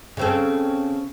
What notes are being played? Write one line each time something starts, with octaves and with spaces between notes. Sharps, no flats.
C#3 C4 A4